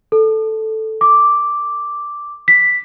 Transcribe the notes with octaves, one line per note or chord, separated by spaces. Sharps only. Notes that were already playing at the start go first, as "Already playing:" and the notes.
A4
D6
B6